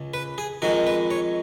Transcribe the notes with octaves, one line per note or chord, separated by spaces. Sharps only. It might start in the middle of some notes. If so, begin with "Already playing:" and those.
Already playing: C#2 C#3
B4
G#4
F2 D#3 G#3 F#4
B4
C#5